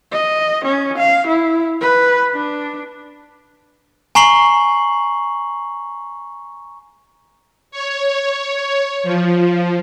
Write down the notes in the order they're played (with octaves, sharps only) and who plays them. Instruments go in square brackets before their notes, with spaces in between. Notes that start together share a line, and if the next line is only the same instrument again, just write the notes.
[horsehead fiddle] D#5
C#4
F5
E4
B4
D4
[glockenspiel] G#5 A#5 C#6 C7 F#7 G7
[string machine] C#5
F3